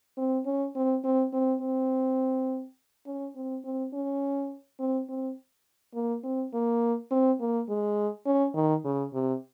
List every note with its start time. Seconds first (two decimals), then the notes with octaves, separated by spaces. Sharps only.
0.18 C4
0.46 C#4
0.75 C4
1.04 C4
1.33 C4
1.61 C4
3.06 C#4
3.35 C4
3.64 C4
3.93 C#4
4.79 C4
5.09 C4
5.94 A#3
6.24 C4
6.53 A#3
7.11 C4
7.40 A#3
7.69 G#3
8.26 C#4
8.55 D#3
8.84 C#3
9.13 C3